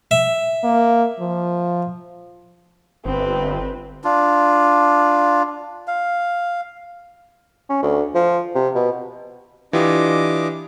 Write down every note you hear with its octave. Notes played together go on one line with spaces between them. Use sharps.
E5
A#3
F3
G1 C4 B4
D4 F4
F5
C#4
D2
F3
C3
B2
E3 D4 F4 G4 D#5 D6